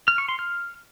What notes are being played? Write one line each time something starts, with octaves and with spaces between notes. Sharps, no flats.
F6
C#6
C6
F6